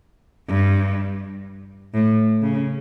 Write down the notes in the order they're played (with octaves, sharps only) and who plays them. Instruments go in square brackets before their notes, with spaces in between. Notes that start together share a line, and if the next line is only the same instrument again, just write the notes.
[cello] G2
A2
C#3